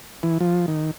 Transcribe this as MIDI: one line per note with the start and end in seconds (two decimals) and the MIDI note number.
0.23 0.38 52
0.40 0.66 53
0.68 0.91 51